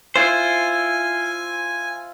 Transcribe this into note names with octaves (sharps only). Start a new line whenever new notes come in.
E4 F4 C5 G#5